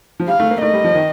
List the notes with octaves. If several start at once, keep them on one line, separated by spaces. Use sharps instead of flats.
F3
G3 F5
A3
A#3
A3 D#5
G3
F3
D#3